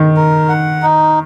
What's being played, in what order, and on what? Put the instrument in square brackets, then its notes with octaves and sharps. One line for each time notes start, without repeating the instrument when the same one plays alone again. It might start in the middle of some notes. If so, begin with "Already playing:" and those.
Already playing: [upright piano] D#3
[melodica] A#4
F#5
D#4